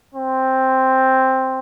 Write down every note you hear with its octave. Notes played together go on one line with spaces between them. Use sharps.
C4